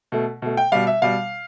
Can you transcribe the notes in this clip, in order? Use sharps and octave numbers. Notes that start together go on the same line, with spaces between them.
B2 A3
B2 A3
G5
B2 G3 F5
E5
B2 G3 F5